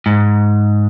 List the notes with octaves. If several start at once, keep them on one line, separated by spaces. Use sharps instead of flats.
G#2